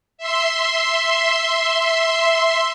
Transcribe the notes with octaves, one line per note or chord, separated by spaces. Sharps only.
E5 C6